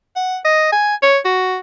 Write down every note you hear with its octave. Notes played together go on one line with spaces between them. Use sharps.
F#5
D#5
G#5
C#5
F#4